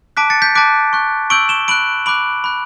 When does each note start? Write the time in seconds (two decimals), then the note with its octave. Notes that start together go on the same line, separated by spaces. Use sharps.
0.17 A5 D6 F#6 B6 D7
0.30 A6 C#7
0.42 G6 B6
0.55 A5 D6 F#6 B6 D7
0.93 C#6 F#6
1.30 C#6 E6 G6 D7 F#7
1.49 E7 G7
1.68 B5 F#6 D7 F#7
2.06 B5 D6 F#6 D7 F#7
2.44 B5 F#6